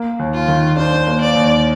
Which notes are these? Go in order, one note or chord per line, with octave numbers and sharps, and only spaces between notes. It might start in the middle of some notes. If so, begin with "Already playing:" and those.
Already playing: A#3
D#2
F4
D#3
D4 C5
A#3
D5
D#2